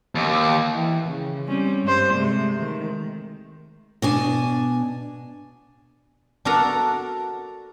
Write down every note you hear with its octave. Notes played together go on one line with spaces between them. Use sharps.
D#2
E3
C#3
G3 C4 C#4
G2 G3 C5
C3 G#3 A3
D#3
B2 D4 G#5
D4 F#4 A4 A#4 A#5